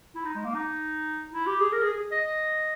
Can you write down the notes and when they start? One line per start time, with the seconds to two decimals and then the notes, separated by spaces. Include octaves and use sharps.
0.15 E4
0.25 D#4
0.35 G#3
0.45 A#3
0.55 D#4
1.33 E4
1.47 G4
1.60 G#4
1.73 A#4
1.83 G#4
1.93 G#4
2.12 D#5